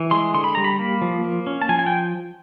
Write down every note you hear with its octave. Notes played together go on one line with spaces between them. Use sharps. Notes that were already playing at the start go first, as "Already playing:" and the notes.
Already playing: E3
G#3 C6
D3 C6
B5
G3 A#5
B5
A#3
F3
A#3
C#4
A5
F3 G#5
G#5
G5